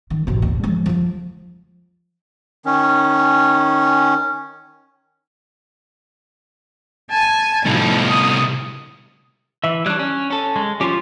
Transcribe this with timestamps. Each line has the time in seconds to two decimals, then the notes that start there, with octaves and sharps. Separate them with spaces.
0.10 D#3
0.27 A1 B2
0.42 D2
0.64 F3 G#3
0.86 F3 F4
2.66 D#3 C#4
7.11 G#5 A5
7.66 C2 A2 F3 D#4
8.09 D#6
9.64 E3 E5
9.86 G3 D4 C#5 F#6
9.99 C#4
10.31 C#4 A4
10.56 G#3
10.81 F3 C#4 F4 G4